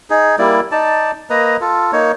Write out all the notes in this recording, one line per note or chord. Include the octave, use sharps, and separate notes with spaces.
D#4 G#4
G3 A#3 E4 D5
D#4 D5 A5
A#3 B4 D#5 A#5
F4 A4
A#3 D#4 C#5